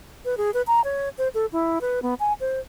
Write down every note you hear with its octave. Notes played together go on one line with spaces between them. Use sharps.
B4
G#4
B4
A#5
C#5
C5
A4
E4
B4
B3
G#5
C5